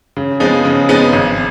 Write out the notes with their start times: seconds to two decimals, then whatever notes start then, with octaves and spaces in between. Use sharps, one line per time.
0.17 C#3
0.40 F3 G#3 B3 D#4
0.65 C#3
0.89 F3 G#3 B3 D#4
1.13 G#1